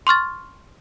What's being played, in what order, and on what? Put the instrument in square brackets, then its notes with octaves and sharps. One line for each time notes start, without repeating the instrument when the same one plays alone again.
[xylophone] C6 C#6 F6 A6